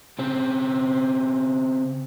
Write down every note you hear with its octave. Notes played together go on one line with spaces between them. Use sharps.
C#3 C4